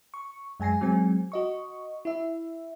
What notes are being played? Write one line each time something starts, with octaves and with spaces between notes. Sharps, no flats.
C#6
F#2 G#3 G#5 A#6 C7
F#3 G#3 C4 G#5
F#4 D#5 C#6
E4 E5